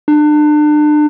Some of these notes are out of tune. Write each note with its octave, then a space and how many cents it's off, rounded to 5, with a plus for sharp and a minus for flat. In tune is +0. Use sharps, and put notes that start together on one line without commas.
D4 +35